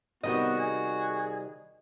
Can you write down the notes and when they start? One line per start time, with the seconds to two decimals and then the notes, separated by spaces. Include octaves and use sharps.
0.23 C3 D#3 G3 B3 F#4 D#5
0.59 G#4